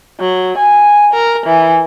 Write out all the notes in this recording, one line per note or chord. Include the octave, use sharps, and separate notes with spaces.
F#3
G#5
A#4
E3